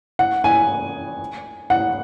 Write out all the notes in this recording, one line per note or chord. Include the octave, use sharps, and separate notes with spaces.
F#5
G#5
F#5